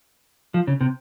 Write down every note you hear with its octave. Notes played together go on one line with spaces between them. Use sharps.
F3
C#3
C3